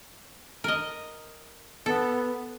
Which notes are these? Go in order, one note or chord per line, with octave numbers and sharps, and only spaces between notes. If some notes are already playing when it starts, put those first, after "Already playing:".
A#4 D#5
B3 A4